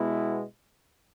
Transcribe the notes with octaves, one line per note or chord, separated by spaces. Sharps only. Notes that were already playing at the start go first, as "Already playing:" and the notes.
Already playing: B2 G#3 B3 E4